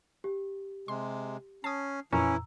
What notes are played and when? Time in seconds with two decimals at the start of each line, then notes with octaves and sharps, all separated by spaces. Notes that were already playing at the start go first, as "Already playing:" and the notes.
0.24 G4
0.88 C3 G#3 C6
1.64 C#4 A5 D#6 C7
2.13 F2 A#2 E3 C#4 E4 A#5 E6